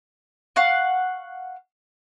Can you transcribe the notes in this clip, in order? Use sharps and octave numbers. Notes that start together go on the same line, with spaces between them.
F5 F#5 C#6